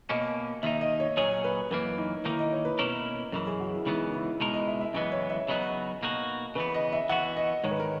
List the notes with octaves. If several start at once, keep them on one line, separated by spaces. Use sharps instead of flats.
B2 A#3 C#4 D#5
D#2 D#3 A#3 D#4 E5
D#5
C#5
A#2 F#3 C#4 G#4 C#5
B4
F#2 E3 A#3 B4
D#4
D#3 A#3 D#4 E4
D#5
C#5
B4
B2 A#3 C#4 E4 A#4
F#2 C#3 E3 A#4
G#4
F#4
E4
C#2 C#3 E3 B3 D#4
E4
C#2 B2 G#3 D#4 E4 A#4
D#5
E5
E5
F#2 C#3 E3 G#3 B3 D#5
C#5
E5
C#3 F#3 B3 D#4 F#4 D#5
B2 A#3 D#4 F#4
C#3 E3 B3 B4
D#5
E5
E3 B3 F#4 F#5
D#5
G#2 D#3 G#3 C#5
B4
A#4